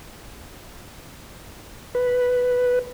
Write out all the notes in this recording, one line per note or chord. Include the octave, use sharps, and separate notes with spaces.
B4